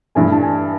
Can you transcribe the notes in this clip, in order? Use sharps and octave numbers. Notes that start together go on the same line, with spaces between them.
G2 E3 A3 G#5
A5
G#5